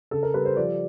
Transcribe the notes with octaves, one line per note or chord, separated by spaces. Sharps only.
C#3 A4
A#4
G3 B4
C5
F3 D5